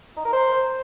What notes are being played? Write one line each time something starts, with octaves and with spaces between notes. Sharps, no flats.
D#4
A#4
C5